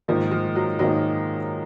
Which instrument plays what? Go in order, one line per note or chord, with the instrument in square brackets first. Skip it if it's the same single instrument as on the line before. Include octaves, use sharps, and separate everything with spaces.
[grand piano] G#2 D#3 A#3 D#4 [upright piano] F3
[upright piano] F3
F#3
[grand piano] G#2 D#3 A#3 D#4 [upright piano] F#3